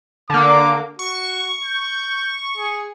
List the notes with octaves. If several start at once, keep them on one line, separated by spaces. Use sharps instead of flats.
D3 A#3 D6
F#4 C#6
G6
G#4